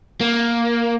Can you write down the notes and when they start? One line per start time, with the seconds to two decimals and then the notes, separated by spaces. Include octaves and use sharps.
0.21 A#3